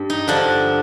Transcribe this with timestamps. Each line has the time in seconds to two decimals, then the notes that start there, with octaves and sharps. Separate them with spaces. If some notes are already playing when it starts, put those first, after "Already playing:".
Already playing: G2
0.10 D#4
0.28 G2 D3 F3 D4